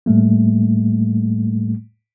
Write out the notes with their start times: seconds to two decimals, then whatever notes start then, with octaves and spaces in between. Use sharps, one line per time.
0.06 A2 G3 A3 A#3